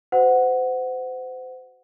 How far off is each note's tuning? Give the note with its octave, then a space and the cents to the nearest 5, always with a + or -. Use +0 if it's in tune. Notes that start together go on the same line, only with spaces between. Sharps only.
F#4 +0 C5 -30 F#5 +0